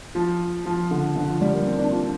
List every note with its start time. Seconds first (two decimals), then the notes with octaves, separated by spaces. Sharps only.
0.15 F3
0.66 F3
0.91 D3
1.16 D3
1.28 F3
1.41 G3
1.54 A#3
1.67 C4
1.78 D4
1.91 F4